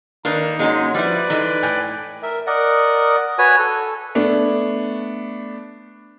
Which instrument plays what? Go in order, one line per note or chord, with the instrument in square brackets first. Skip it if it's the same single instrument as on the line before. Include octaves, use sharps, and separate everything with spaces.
[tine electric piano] D#3 [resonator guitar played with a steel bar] A#3 D4 B4 [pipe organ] D#4
[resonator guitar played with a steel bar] G#2 F#3 G#3 [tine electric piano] A#3 C#4
[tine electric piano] F3 [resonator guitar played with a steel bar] G3 E4 [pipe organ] B4 D5
[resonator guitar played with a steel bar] E3 G#3 [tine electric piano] D#4 A4 D6
[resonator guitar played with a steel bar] A2 [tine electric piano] G5 G#5 G6
[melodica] A#4 E5
A#4 D5 D#5 F#5
F#4 B4 C#5 G#5
A4
[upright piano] A3 B3 D4